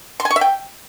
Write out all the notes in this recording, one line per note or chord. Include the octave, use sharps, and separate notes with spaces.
C6
G#5
C#6
E5
G5